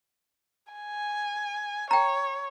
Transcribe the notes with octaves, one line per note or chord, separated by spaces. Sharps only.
G#5
C#5 G5 A#5